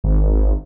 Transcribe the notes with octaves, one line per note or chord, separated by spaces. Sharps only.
G#1